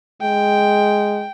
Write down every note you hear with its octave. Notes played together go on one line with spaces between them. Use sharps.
G#3 G5